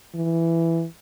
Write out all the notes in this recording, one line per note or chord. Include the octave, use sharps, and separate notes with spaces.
E3